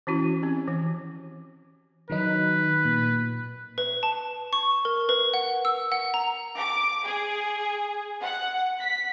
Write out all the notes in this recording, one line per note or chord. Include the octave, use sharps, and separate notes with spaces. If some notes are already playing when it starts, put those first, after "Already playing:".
E3 C#4 E4 F#4
C4 C#4 G4
E3
D#3 F#3 D#4 B4
A#2
B4
A5
C#6
A#4
B4
F#5
E6
F#5
A#5
D6
G#4
F#5
B6